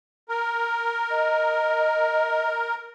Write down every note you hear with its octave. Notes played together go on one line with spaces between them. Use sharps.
A#4
D#5